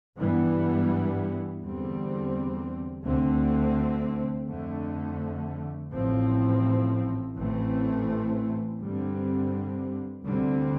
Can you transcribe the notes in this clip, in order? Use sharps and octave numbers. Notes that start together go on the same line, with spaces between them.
G2 E3 G3 B3
E2 D3 G3 C4
D2 D3 A3 C4
F2 D3 A3
A1 A2 F3 C4
A1 A2 E3 A3 C4
G2 D3 G3 C4
D2 D3 G3 C4